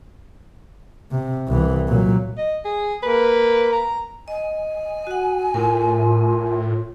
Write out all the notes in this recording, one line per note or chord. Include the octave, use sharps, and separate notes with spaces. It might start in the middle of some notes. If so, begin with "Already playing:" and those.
C3
C2 E3
A#2 F#3
D#5
G#4
A#3 B4
A#5
D#5 G#5
F#4 F#5
A2 F4 A#4